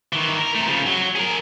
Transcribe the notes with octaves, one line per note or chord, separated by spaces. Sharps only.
D#3 E3
A#4
C3 A3
C#3 F3
F#3
G#4 A#4